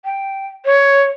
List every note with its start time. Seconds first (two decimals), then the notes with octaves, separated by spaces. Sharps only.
0.05 G5
0.65 C#5